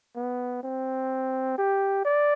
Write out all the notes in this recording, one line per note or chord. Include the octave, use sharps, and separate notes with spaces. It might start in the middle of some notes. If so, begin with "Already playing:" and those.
B3
C4
G4
D5